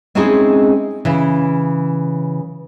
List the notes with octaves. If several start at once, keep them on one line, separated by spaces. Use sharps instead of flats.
G#3 C4 C#4 D#4 E4 G#4
C#3 E3